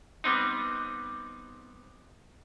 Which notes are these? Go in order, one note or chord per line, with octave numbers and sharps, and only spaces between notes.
G3 B3 C4 D#4